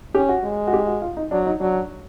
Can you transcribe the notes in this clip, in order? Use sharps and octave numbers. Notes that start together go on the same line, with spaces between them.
C#4 G4
F#4
G#3
F#4
G4
F#4
F4
D#4
F#3 D4
D#4
F#3 D4